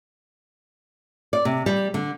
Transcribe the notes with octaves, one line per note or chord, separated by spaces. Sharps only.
D5
C3
G3
D3